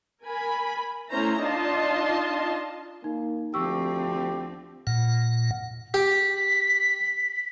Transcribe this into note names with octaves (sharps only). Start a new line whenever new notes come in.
A#4 G#5 B5
A3 C#4 E4 C5 A#5
D4 D#4 F4 D#5 A5 C6
A#3 D#4
D2 F3 C4 G4 C#6 E6
A#2 F#5
G4 B6